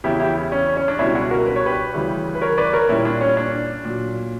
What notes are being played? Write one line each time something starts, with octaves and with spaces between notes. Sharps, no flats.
E2 C#3 E3 E4 G4
E4 G4
C#4
C#4
D4
C#2 B2 G3 C#4 E4
D4 F#4
F#4 A#4
B4
C#5
G4 B4
D2 C#3 E3 G3
B4
A#4 C#5
B4 D5
A#4 C#5
A#2 G3 C#4 E4
D4
C#4
D4
A#2 F#3